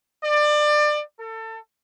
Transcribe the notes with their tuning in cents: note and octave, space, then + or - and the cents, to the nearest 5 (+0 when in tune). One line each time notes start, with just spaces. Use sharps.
D5 +25
A4 +30